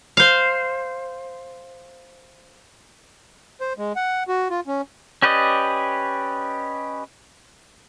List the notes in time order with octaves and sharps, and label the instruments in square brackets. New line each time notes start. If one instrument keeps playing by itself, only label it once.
[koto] C5 F5
[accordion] C5
G#3
F#5
F#4
F4
C#4
[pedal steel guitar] C#4 G4 B4 D5 D#5